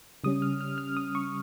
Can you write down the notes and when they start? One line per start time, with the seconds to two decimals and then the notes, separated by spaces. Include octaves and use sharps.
0.24 C#3 G3 C#4 D#6
0.42 F6
0.61 F6
0.78 F6
0.97 D#6
1.15 C#6